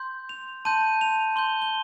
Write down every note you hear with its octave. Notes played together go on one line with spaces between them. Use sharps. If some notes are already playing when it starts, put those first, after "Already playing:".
Already playing: C6 G6
F7
A5 C6 G6 D#7
F7
C6 G6 G7
G7